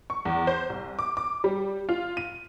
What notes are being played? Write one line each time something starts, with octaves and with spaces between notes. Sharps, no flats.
C#6
E2
C5
C2
D6
D6
G3
F4
D#7